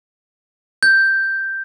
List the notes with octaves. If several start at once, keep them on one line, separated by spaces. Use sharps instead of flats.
G6